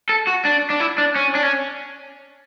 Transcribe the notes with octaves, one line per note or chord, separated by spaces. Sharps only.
A4
F#4
D4
D4
E4
D4
C#4
D4
C#4